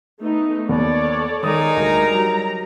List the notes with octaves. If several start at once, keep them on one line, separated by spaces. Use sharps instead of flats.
A3 B3 D#4
D#2 B3 A4 C#5 D5
D#3 G#3 D#4 A#4 D#6
D2 G3 A#5
F#3